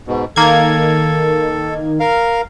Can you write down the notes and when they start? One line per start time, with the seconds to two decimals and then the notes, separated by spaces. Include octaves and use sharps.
0.07 G#2 B2
0.36 D#3 A#3 A4 G#6
2.00 A#4 F5